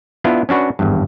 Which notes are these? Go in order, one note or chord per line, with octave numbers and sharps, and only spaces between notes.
B3 D4 E4 F4 F5
C#4 D4 F#4 B4
G#1 E2 G2